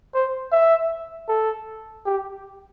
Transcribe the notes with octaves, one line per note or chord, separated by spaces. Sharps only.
C5
E5
A4
G4